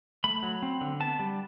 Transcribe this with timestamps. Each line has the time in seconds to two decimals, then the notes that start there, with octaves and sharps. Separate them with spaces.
0.24 A3 B5
0.43 F#3
0.62 C4
0.81 D3
1.00 B3 A5
1.19 G3